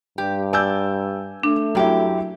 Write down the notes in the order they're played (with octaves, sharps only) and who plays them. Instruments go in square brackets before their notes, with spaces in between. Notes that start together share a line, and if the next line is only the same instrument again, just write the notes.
[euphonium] G2 [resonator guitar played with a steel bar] G4
[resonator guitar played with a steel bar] D5 [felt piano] G#5 E6 G6
[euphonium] A3 [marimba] D4
[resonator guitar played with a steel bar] F#2 G4 [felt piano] F#3 E4